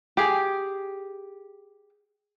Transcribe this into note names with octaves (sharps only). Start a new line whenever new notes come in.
G4 G#4